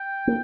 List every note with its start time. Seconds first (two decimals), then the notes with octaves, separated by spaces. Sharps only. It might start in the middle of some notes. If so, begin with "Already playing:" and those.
Already playing: G5
0.27 A#3